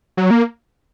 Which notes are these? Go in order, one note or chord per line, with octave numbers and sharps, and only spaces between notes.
F#3
A#3